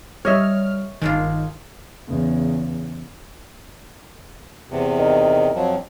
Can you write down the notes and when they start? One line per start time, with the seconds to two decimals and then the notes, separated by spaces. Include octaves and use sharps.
0.25 G3 C#5 D#5 E5 F6
1.02 G1 D#3 G#3 D4 F4
2.07 E2 C#3
4.71 E2 C3
4.98 D#3
5.55 F2 F3 F#3